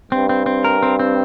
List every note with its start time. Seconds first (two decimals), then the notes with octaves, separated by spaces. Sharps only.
0.11 G2 C4
0.29 C4
0.46 C4
0.64 A#4
0.83 C4
0.99 C4